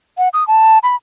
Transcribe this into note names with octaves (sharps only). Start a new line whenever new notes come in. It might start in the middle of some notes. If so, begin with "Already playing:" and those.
F#5
D#6
A5
B5